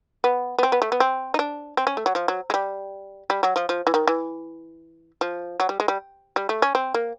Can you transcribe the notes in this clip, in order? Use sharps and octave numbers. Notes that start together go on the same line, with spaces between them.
B3
B3
C4
B3
A3
B3
C4
D#4
D4
C4
C#4
A3
F#3
F3
F#3
G#3
G3
G3
F#3
F3
F3
E3
D#3
E3
F3
F#3
G3
G#3
G3
G3
A3
C#4
C4
A#3